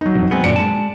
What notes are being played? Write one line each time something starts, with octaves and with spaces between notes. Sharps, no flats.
F#3 D#4
C2 F2
G#3 B3 C4
F#2 A#2 D3 D5 C#7 D7
G#3 A5